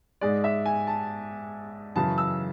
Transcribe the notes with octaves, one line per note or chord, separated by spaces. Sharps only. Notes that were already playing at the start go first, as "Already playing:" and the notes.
G#2 G#3 D5
E5
G#5
A5
F#2 C#3 E3 A5
E6